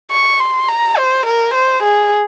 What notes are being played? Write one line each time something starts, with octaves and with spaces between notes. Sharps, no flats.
C#6
C6
A#5
C5
A#4
C5
G#4